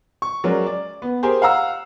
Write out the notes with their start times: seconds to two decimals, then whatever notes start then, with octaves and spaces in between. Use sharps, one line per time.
0.22 C#6
0.44 F#3 G#3 C#4 A#4 D5
0.67 D5
1.02 B3
1.23 G4 G#4 A#4 C5 G#5
1.42 F5 F#5 A#5 E6